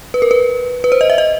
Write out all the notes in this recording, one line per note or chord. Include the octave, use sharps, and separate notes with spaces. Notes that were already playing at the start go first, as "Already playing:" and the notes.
B4
A#4
B4
B4
C5
D#5
E5
D#5